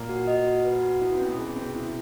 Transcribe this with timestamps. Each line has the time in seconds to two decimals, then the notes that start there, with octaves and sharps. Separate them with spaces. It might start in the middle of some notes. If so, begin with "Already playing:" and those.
Already playing: A#2 A#3
0.09 F#4
0.27 D#5
0.46 F#4
0.64 B4
0.83 F#4
1.01 B3 E4
1.15 C4
1.20 C#4
1.28 B2 B3
1.38 G#4
1.56 C3 C4 C#4
1.75 E4